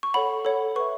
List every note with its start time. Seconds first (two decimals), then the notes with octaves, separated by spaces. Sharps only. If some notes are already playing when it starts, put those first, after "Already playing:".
0.03 C#6
0.14 A4 C#5 F#5 B5
0.45 A4 C#5 F#5
0.76 B4 E5 C#6